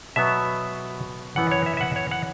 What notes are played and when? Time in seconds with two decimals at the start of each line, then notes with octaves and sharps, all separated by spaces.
0.16 B2 F#3 B3 E5
1.36 F#2 E3 B3 F#5
1.51 C#5
1.66 E5
1.77 E5
1.81 F#5
1.96 C#5
2.11 F#5